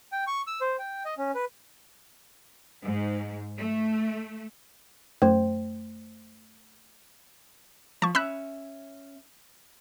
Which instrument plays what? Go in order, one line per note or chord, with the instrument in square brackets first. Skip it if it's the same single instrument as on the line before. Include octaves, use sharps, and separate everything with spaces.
[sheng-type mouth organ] G5
C#6
E6
C5
G5
D#5
C#4
B4
[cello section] G#2
A3
[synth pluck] F#2 C5 [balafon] A3
[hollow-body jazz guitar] F3 [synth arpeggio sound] A5 C#6
[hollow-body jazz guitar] C#4 E5 [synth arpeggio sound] B5 E6 F#6